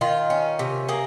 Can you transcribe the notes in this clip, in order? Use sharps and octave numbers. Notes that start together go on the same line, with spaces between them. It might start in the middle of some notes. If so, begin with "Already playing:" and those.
D#3 F4
C#4
C3
A#3 G#4